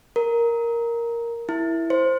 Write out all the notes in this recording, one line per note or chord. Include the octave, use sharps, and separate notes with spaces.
A#4
E4
C5